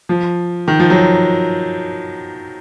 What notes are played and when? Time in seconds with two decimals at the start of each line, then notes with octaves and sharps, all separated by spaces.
0.09 F3
0.68 D#3
0.80 F3
0.90 F#3